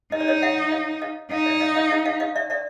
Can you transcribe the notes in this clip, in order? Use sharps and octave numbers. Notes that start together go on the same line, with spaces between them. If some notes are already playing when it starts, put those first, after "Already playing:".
D#4 D#5
D5
C#5 D#5
E5 F#5
D#5 F5
D#5 F5
D#4 D#5 F5
D5 E5
D#5 F5
D#5 F5
D#5 F5
D#5 F5
D#5 F5
D5 E5
D5 E5